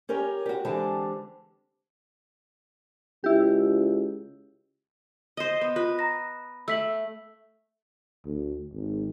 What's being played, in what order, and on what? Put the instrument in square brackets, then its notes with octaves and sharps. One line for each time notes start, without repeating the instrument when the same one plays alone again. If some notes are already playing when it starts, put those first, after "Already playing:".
[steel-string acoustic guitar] C#4 G4 A#4 C#5
F#4 G4
D3 E3 G#3 C4 G4 A5
[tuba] C#2 [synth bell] E4 G4
[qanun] C5 D#5
B3
[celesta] F4 [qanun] B4
[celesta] A#5 A#6
[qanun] A3 [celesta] E6 B6 F#7
[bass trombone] D2
G#1